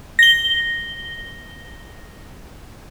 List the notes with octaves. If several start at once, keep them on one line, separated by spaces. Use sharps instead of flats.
A#6 G7